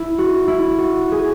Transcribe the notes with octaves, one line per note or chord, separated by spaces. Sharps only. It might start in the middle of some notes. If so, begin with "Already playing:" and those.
Already playing: E4
F#4
E4
F#4
G#4